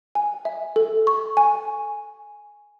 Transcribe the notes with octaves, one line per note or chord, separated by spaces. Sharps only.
G#5
E5
A4
C#6
G#5